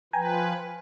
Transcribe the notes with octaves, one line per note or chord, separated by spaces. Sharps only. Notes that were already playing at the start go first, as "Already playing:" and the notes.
F3 B4 G5 G#5 A#5